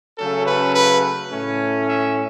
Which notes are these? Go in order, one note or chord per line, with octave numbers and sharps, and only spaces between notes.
C#3 F#3 A3 C#4 A4
B4
B4
A2 A3 C#4
E5